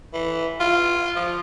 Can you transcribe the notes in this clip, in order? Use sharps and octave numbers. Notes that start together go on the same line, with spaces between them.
E3
F4
F3